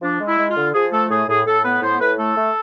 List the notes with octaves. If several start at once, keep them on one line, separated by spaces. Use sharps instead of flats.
F3 D4
G#3
E4
G#3
F4
D3
F3 G#4
A3 A4
A2 G#4
A2 G#4
A2 A4
B3 B4
A2 C5
A2 B4
A3 A4
A3